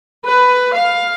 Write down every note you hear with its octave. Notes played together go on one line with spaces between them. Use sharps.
B4
F5